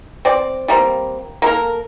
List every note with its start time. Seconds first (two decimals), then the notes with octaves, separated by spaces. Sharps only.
0.25 C4 D5
0.68 G3 A#3 C4
1.42 A#3 A4 A#4